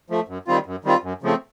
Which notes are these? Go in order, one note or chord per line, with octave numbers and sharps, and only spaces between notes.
F3 A3
F#2
D#3 G3 C4 F4
F#2
D#3 G3 C4 F4
F#2
C#3 F3 A3 C4